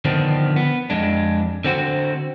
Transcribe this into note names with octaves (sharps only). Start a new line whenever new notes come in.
D3 D#3 F3 B3 C4 D4
B3
F2 G#3 D4
D3 C4 F#4 C5